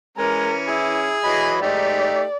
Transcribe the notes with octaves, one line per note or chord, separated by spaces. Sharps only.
E3 G#3 C#4 A#4
E4 G#4
E3 F#3 D#5 B5
G#2 A3 D#4 G4 D5